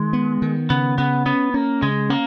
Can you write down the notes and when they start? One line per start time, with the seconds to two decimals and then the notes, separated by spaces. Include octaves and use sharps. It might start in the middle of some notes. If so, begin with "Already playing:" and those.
Already playing: D#3 G#3
0.13 B3
0.42 D#3
0.70 C#3 B3
0.98 C#3 B3
1.26 B3 C#4
1.54 A#3 C#4
1.82 C#3 G#3
2.10 A#3 C#4